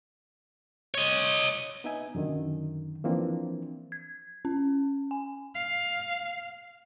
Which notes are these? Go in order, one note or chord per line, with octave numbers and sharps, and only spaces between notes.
C#5 D#5
B3 D#4 E5 G#5
F#2 D3 D#3
E3 F3 A#3 C4 D4
G#6
C#4
G#5
F5